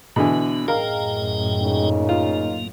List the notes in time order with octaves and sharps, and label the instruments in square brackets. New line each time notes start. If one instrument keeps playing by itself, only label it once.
[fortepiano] B2 D3 E3 [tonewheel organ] B3
[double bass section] F#2 A2 [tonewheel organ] G#4 D#5 G5 [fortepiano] A#4 F5
[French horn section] A#2 C#3 D#4
[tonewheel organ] A#3 [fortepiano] F4